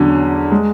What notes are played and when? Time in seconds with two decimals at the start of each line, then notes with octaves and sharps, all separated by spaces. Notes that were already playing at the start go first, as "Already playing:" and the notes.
Already playing: E2 D3 F#3 C#4
0.52 G#3